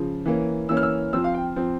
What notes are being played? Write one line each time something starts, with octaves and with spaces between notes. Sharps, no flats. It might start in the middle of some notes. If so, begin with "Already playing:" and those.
Already playing: C#3 F3
E3 A#3 C#4
E3 A#3 C#4 E6
F6
E6
F3 C4 E6
F5
G5
F3 C4